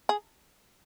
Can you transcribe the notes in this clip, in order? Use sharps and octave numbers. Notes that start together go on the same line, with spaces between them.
G#4